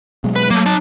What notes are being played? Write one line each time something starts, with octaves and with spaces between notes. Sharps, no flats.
B2 F#3 G#3
B4
F#3 A3 A#3
D#4 A5